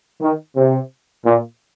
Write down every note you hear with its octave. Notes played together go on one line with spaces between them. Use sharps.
D#3
C3
A#2